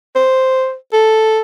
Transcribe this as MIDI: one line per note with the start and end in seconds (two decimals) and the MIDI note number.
0.16 0.74 72
0.93 1.41 69